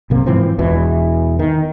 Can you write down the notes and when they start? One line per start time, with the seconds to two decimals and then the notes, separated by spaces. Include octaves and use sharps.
0.10 B1 C3 A#3
0.26 G#2 E3 F3 C4
0.59 E1 E2 B2 E3
1.39 D#3